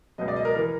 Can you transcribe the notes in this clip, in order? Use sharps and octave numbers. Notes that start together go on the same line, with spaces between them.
C#2 B2 F#3 D#5
D5
D#5
A#4
E3 A#4